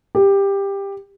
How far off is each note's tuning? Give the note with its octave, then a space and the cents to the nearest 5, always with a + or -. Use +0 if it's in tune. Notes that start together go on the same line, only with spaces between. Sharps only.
G4 +15